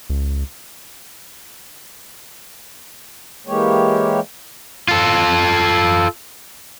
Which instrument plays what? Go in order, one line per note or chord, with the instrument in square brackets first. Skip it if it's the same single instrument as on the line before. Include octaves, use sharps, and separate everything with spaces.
[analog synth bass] C#2
[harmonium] E3 G#3 A#3 G4 C#5
[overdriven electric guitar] F4 A4